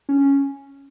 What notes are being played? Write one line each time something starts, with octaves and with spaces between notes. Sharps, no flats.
C#4